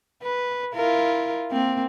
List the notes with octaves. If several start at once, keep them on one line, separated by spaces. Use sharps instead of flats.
B4
E4 F4 A#4
A#3 C4